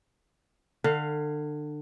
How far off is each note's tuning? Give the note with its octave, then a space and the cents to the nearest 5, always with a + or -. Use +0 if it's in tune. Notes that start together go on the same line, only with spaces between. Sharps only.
D3 +30 F5 +5